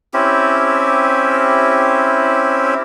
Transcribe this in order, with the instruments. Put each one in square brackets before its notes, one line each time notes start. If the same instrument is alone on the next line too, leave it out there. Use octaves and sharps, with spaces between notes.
[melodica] C4 C#4 E4 G4